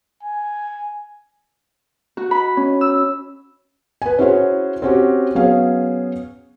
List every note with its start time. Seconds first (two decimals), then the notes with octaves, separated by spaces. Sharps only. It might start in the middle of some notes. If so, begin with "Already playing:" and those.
0.23 G#5
2.17 F#4
2.31 B5
2.57 C#4
2.81 E6
4.02 B4 G#5
4.19 C#4 E4 F#4 G#4 C5 C#5
4.82 C4 C#4 F#4 G4
5.35 F#3 B3 C#4 G#4 F5